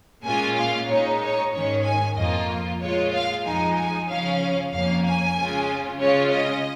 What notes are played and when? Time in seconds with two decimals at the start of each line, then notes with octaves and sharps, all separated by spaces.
0.24 A#2 G#3 C#4 F4 G#5
0.56 F5
0.88 A#2 G#3 D#4 C#5
1.20 C#5
1.52 G#2 D#3 G#3 C#4 C#5
1.84 G#5
2.16 F2 F3 A#3 F4 D#5
2.80 A#2 G#3 F4 C#5
3.12 F5
3.44 F2 F3 G#3 D#4 G#5
3.76 G#5
4.08 C#3 F3 C#4 F5
4.72 F2 F3 A#3 C#4 F5
5.04 G#5
5.37 C#3 G#3 C#4 F4
6.00 C#3 G#3 C#4 F4 C#5
6.32 D#5